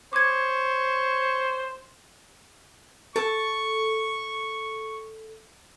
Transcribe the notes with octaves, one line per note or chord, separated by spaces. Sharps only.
C5 C#5 D6 G#6
A4 A5 C#6